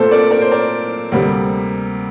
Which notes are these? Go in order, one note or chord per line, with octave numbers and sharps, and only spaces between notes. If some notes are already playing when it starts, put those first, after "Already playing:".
Already playing: A#2 A3 C4 A4 C5
A#4 D5
A#4 D5
C5
A#4 D5
D2 C3 G3 A#3